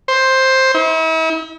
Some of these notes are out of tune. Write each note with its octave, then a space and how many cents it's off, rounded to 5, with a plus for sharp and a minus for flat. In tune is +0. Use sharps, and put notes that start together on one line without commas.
C5 +10
E4 -40